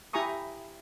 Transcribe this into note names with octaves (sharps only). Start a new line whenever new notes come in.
E4 G4 G#5 A#5 C#6 D#6